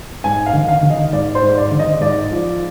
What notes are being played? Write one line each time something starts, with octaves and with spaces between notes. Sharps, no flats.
G#2 G#5
F5
D#3
F5
D#3
D#5
G#2 D5
C5
G#2
D5
D#3
D#5
G#2 D5
F3